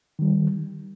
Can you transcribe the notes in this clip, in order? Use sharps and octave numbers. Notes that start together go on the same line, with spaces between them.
D#3 G3